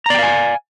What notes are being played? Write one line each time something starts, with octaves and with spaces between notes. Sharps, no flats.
D5 F5 G5 G#5 A#5